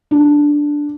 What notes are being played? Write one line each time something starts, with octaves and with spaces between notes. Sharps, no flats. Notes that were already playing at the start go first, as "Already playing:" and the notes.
D4